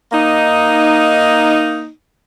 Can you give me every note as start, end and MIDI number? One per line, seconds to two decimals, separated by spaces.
0.12 1.88 58
0.12 1.88 63